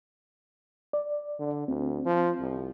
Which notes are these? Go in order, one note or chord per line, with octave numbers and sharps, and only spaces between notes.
D5
D3
D2 C4
F3
C2